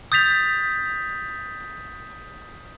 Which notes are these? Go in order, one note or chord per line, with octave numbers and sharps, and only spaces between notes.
D#6 G6 A6 B6 F7